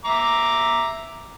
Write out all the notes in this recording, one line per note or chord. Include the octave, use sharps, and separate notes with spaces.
E5 A#5 D6